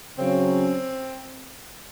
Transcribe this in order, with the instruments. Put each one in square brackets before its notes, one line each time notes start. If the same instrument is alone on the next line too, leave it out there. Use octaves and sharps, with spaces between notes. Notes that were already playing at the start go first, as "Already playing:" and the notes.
[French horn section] C#3 F#3 C#4 [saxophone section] C4